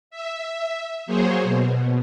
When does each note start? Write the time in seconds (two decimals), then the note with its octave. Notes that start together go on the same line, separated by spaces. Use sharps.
0.11 E5
1.06 F#3 A#3 G#4 C5 C#5
1.43 B2